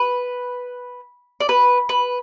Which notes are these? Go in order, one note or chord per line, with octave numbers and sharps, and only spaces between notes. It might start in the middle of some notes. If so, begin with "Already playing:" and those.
Already playing: B4
D5
B4
B4